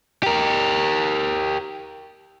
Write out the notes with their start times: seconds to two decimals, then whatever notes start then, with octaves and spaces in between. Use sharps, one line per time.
0.23 G4 A#4